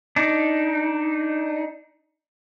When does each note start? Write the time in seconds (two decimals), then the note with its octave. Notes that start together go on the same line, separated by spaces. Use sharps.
0.16 D4 D#4